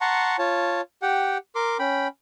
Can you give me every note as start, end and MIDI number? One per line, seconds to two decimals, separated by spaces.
0.01 0.36 78
0.01 0.36 81
0.01 0.36 82
0.01 0.36 84
0.01 0.36 85
0.39 0.81 65
0.39 0.81 73
0.39 0.81 81
1.02 1.38 67
1.02 1.38 78
1.02 1.38 79
1.55 1.77 70
1.55 1.77 84
1.55 1.77 86
1.79 2.08 61
1.79 2.08 79
1.79 2.08 83